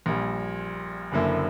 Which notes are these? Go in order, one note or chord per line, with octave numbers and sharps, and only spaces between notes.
A#1 A#2 G3
F#1 F#2 D3 A#3 E4